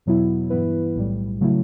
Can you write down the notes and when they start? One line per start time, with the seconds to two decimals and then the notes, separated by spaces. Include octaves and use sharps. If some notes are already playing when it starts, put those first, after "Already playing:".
0.06 E2 B2 F#3 B3 E4
0.50 G2 E3 B3 E4 B4
0.95 B1 A2 G3
1.41 C#3 F#3 A3 E4